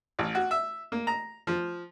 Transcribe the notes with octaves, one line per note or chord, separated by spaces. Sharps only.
A1
F#4
E5
A#3
A#5
F3